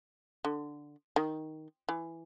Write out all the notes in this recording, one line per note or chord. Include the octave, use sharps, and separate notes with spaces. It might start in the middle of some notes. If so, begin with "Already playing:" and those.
D3
D#3
E3